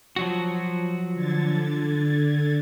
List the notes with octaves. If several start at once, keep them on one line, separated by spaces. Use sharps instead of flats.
F3 F#3 F#4
D3 G#6 A6